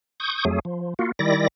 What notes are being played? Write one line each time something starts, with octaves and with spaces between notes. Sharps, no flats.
C#6 D#6 G6
F2 F#3 A3 G#4
F3
A#3 F4 F#4
D#3 G3 E4 D5 A#6